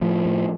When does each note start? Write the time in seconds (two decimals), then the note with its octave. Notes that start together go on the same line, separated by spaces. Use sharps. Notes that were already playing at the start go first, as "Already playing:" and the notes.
0.01 A2 F3
0.26 A2